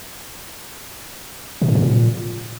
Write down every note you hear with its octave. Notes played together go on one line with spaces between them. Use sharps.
B2
A2
C3
A#2